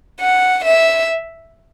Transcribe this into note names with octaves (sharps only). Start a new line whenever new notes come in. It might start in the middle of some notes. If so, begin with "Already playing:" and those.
F#5
E5